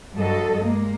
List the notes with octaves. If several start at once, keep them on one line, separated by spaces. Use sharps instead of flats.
G2 F#3 A4 D#5
G#3 A#3